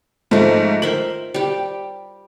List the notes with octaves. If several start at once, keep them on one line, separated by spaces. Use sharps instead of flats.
G#2 F3 A3 D#4
A#4 C5 E5 F#7
G3 G4